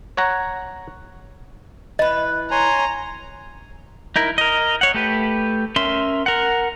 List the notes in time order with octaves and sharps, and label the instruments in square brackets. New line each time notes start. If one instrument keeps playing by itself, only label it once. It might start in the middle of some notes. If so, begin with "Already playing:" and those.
[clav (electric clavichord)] C#5 F#5 A#5
[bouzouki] E3 B4 [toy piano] D#5
[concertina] C#5 G#5 C6 [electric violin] A#5
[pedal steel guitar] D#4 E4 A#4
A#4 D#5
C#5 F#5
A3 G4 B4
C#4 A#4 E5 C6
A#4 F#5